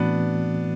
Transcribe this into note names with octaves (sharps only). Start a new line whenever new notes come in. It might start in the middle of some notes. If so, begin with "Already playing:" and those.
Already playing: A2 E3 A3 B3 C4 D4 F#4